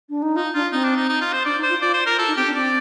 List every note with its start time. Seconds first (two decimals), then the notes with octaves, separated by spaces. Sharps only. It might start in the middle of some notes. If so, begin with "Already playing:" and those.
0.09 D4
0.22 D#4
0.36 D#4 F4
0.54 D4 F4
0.72 C4 D#4
0.84 D4
0.96 D#4
1.09 D#4
1.21 F4
1.33 C5
1.45 D4 D5
1.57 D#4
1.63 C5
1.69 F4
1.81 F4 D5
1.94 C5
2.06 A#4
2.18 F4 A4
2.27 D#4
2.36 C4 G4
2.46 D4
2.55 C4 D5